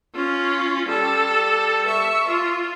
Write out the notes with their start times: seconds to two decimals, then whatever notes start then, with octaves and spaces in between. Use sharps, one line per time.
0.15 C#4 F4
0.89 G3 A4
1.87 E5 C#6
2.29 F4